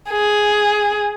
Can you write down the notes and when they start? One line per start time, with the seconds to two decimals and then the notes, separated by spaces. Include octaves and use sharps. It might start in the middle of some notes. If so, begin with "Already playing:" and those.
0.10 G#4